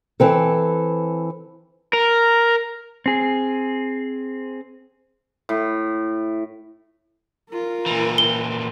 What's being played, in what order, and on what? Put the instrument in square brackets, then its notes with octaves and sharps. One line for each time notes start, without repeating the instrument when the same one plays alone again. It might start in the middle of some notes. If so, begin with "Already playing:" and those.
[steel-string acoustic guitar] E3 C4 A4
[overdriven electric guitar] A#4
[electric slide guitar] C4 G#4
[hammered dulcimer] A2
[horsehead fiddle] F4 A#4
[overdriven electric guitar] A#2 E3
[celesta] G7